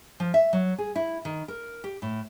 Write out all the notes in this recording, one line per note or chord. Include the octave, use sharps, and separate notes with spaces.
F3
E5
F#3
G#4
E4
D#3
A#4
G4
A2